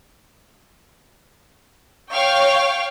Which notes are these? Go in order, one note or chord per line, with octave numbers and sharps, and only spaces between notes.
C#5 F5 G5 C#6